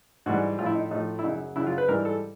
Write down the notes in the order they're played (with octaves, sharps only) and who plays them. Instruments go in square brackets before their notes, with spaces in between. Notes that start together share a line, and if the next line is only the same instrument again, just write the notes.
[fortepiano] G#2 E3 G3 F#4
A2 F3 F4
E4
D#4
A2 F3 D#4
E4
F#2 C#3 F#3 D#4
F#2 C#3 F#3 E4
F4
B4
G#2 E3 G3 A#4
A4